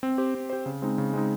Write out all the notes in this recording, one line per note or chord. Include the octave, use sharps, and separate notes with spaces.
C4
G4 C5
C4
G4 C5
C#3
G#3 C4 D#4
C#3
G#3 C4 D#4